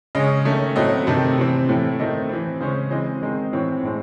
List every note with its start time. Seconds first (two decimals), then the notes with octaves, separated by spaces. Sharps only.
0.15 C#3 G#3 C#4 D#5
0.45 D#3 A3 C#4
0.76 A2 F#3 A3 C4 D#5
1.07 C3 D#3 A3 C4
1.38 C3 E3 C4
1.68 A2 E3 A3
1.99 D#3 A3 C4 D#5
2.29 E3 C4
2.60 C#3 G#3 C#4 C5
2.91 E3 G#3 C4 D#5
3.22 D#3 G#3 C4
3.53 A2 E3 C4 C#5
3.83 A2 G#3 C4